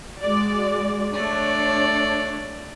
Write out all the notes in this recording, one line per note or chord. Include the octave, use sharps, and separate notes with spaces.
G#3 F#4 D5
A3 D4 C#5 D5